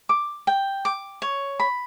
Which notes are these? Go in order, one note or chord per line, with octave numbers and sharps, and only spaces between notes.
D6
G5
D6
C#5
B5